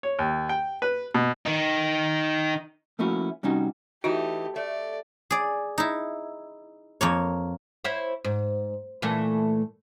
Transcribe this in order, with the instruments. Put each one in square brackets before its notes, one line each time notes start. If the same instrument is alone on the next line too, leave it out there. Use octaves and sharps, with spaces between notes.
[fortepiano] C#5
D#2
G5
B4
B2
[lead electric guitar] D#3 D#4
[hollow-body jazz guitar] F3 A3 A#3 C#4 E4 F#4
C3 G3 C#4 D#4 F#4
[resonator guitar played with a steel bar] E3 D#4 [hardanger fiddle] A3 G4 [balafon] F#4
[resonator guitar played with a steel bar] A3 [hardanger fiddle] D5
[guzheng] G#4 D5
D#4 E4
F2 A#3 C#5
[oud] E4 C5 C#5
G#2
A#2 E3 A3